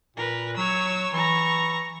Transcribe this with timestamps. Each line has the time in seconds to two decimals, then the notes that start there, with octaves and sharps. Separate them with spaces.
0.16 A#2 A#4 B4
0.57 F#3 C#5 E6
1.13 E3 A#5 C#6